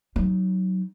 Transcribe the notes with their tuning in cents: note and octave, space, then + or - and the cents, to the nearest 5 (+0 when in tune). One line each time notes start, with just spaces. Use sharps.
F#3 +10 D#4 +0